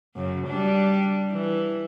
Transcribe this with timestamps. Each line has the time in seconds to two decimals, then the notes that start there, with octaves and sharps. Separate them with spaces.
0.16 F#2 C#3
0.48 G3 D4
1.32 E3